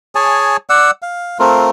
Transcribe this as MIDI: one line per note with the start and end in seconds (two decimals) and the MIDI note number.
0.15 0.57 68
0.15 0.57 73
0.15 0.57 80
0.15 0.57 81
0.70 0.91 74
0.70 0.91 78
0.70 0.91 88
1.02 1.38 77
1.39 1.70 57
1.39 1.70 60
1.39 1.70 65
1.39 1.70 70